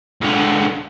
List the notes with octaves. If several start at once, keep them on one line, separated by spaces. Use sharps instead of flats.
C#2 D3